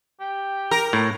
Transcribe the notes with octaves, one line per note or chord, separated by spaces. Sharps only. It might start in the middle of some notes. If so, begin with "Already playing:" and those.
G4
A#4
A2